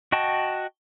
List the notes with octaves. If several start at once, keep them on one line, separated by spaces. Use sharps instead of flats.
F#4 D#5 G5 A5